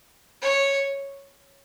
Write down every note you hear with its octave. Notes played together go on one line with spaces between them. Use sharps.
C#5